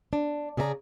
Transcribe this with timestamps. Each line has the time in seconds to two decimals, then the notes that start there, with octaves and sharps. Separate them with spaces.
0.13 D4
0.57 C#3 G#4 D5 D#5 A#5